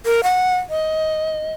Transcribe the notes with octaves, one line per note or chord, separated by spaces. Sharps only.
A#4
F#5
D#5